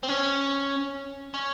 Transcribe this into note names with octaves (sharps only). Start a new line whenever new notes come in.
C4
C#4
C#4